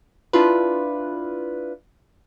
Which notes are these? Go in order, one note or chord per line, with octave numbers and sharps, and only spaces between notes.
D4 E4 F4 B4